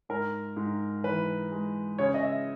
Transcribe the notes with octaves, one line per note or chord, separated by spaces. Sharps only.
G#2 A#4
G#2
E3 B4
G#3
C#3 C#5
D#5
E5